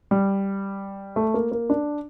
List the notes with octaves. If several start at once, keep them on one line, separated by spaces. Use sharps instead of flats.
G3
A3
A#3
A#3
D4